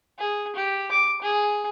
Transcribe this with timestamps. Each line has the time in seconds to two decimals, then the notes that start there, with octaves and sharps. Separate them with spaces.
0.19 G#4
0.56 G4
0.92 D6
1.22 G#4